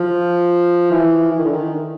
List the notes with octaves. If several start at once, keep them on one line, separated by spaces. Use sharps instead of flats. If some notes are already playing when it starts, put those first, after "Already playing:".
Already playing: F3
E3
E3
D#3
D3
D#3